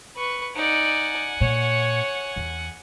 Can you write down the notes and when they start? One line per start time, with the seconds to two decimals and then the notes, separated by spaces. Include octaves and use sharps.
0.16 B4 C#6
0.56 D#4 D5 F#5 G#5
1.41 A#2 C#5
2.36 E2